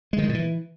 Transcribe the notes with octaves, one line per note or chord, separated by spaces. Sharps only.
G#3
D#3
G#3
A#2
E3